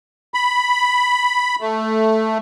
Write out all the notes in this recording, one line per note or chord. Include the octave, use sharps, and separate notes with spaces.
B5
A3